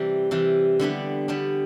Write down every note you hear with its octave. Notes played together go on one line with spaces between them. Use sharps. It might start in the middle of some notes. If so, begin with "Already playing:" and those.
Already playing: C3 E3 G3
C3 E3 G3
D3 G3 B3 D4
D3 G3 B3 D4